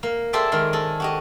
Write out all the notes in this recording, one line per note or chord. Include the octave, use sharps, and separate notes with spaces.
A#3
G#4 A4 C5 D5 E5 G5
D#3 G#3 A#4 D5 C6
G#4 A4
F#4 G4 D#5